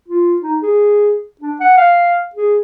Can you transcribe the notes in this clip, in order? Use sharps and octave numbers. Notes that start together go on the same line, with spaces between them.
F4
D#4
G#4
D4
F#5
F5
G#4